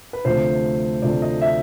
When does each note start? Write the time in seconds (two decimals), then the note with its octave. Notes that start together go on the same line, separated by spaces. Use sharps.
0.13 B4
0.25 D2 C3 F3 A3 C5
1.02 D2 C3 F3 A3 D5
1.22 D#5
1.41 E5